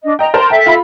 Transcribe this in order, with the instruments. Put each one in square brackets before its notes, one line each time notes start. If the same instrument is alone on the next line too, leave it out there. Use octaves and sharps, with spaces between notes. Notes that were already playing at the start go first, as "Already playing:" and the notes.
[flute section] D4 D#5
[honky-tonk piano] D#5 G5 [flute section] A#5
[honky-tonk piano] A#4 C5 A5 [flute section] C6
[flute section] A4 E5 [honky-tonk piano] G5
[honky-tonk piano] F4 B5